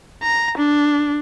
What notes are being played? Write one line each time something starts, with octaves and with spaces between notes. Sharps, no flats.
A#5
D4